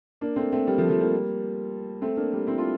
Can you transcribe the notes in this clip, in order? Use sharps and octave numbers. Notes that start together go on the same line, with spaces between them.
A#3 D4
A3 C4
A3 C4
G3 A#3
F3 A3
F3 A3
G3 A#3
A3 C4
A#3 D4
G3 A#3
C4 E4
D4 F4